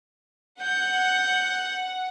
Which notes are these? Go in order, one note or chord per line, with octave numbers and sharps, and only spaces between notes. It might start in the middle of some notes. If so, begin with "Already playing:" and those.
F#5 G6